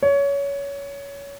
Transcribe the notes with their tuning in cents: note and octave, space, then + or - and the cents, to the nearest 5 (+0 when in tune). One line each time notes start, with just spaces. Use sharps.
C#5 +20